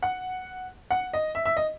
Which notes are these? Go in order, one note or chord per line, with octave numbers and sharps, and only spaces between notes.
F#5
F#5
D#5
E5
E5
D#5